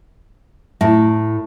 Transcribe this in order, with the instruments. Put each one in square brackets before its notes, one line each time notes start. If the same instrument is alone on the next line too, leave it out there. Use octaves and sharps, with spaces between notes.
[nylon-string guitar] A2 [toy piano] E4 E5